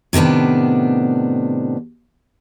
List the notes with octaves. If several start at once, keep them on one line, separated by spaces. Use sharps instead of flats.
A2 C3 D#3 B3 D4